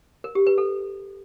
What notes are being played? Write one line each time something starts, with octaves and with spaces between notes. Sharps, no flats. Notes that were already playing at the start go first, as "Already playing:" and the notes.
A#4
G4
B4
A4